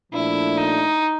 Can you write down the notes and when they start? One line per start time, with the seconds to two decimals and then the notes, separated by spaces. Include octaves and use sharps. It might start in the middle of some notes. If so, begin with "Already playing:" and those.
0.13 A#2 F3 A3 D4 E4
0.58 D#4